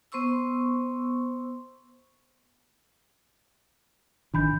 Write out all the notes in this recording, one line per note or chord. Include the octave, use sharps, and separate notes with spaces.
B3 C5 C6 C#6 E6
G#1 D#3 E3 D4 B5 G6